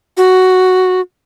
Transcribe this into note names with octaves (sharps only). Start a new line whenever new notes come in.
F#4